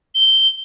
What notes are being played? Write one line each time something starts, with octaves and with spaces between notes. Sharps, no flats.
G7